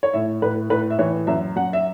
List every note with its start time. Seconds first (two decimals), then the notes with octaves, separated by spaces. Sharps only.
0.03 C#5
0.13 A2 E5
0.42 A2 B4
0.70 A2 B4
0.90 E5
0.99 E3 C#5
1.27 F#2 E5
1.56 F#2 F#5
1.73 E5